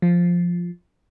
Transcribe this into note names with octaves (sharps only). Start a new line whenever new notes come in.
F3